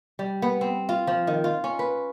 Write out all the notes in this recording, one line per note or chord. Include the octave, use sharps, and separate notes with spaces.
G3
B3
C4
F4
F3
D#3
F4
C#4
B4